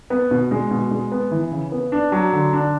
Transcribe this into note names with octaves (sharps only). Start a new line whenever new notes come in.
B3
B2
G#3
B2
G#3
B3
E3
C#3
B3
D4
F#3
D3
D4